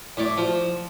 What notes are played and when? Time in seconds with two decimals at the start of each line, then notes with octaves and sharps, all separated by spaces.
0.17 A2 D5
0.37 F3